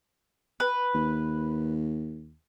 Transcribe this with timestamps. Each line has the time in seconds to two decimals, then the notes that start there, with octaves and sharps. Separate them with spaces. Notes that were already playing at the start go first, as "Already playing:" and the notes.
0.60 B4
0.94 D#2